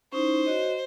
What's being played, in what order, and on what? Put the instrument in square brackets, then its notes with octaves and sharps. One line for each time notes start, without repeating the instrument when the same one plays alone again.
[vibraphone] C#4 D#4 E4 [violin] C5
[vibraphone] F#4 C#5 D#5